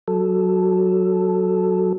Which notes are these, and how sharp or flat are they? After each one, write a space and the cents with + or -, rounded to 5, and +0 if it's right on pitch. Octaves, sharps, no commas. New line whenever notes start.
F#3 +0 A4 +0